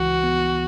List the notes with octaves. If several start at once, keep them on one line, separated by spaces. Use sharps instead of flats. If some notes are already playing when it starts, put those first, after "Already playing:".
Already playing: C#2 E3 F#4
B3